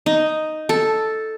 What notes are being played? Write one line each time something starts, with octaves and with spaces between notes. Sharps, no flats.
D#4
A4